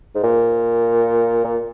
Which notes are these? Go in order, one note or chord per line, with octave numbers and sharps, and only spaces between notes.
G#2
A#2
A#2